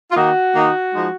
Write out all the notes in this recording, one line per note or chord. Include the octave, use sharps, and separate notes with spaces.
F4
D#3 A#3 D#4 F#4
D#3 A#3 D#4
F3 G#3 D#4